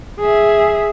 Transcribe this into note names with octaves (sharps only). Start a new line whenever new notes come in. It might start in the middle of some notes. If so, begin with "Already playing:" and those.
G#4 E5